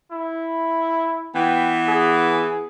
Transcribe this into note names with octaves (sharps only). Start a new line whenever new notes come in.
E4
E3 B3 G5
G#4